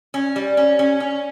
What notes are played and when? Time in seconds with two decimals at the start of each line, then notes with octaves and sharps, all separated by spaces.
0.14 C#4
0.36 G3
0.57 C#4
0.79 C#4
1.00 C#4